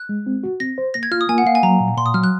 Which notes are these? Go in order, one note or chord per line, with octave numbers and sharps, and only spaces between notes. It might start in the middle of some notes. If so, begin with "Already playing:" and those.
Already playing: F#6
G#3
C4
F#4
C4 A#6
C5
A#3 A#6
G#6
F4 F6
D#6
A#3 G#5
F#5
A#3 F5
G#5
F#3 A#5
A#2
A#2 C6
D#6
F#3 F6
F#6